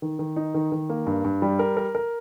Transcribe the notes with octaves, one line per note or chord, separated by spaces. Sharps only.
D#3
D#3
D#4
D#3
D#3
A#3
G2
G2
G3
A#4
A#4
A#4